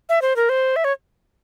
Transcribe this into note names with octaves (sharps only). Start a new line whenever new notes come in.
E5
C5
A#4
C5
E5
C#5